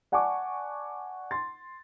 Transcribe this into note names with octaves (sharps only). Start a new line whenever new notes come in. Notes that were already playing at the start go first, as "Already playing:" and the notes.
D5 F#5 G#5 A5 C#6 D6
C6 A6